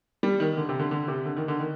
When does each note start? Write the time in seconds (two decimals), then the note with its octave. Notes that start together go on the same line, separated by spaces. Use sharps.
0.23 G3
0.40 D#3
0.57 D3
0.69 C3
0.80 D3
0.91 D3
1.08 C3
1.25 D3
1.37 D#3
1.48 D3
1.59 D#3